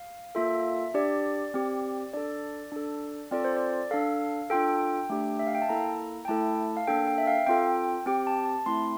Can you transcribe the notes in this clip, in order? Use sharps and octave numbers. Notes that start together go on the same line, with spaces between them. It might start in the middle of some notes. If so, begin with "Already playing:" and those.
Already playing: F5
A#3 F4 A4 E5
D4 G4 D5
C4 G4
D4 A4 D5
D4 A4
C4 F4 A4 D5
C5
D5
D4 A4 F5
D4 F4 A4 G5
A3 D4 G4
E5
F5
G5
A5
A#3 E4 A4 A#5
G5
A3 E4 A4 A5
F5
A#3 D4 A4 G5
G5
E5
F5
C4 F4 A4 G5
C4 G4 G5
A5
A5
A3 C4 E4 C6